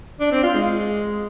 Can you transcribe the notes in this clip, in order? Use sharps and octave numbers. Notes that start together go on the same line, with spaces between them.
D4
C4
F4
G#3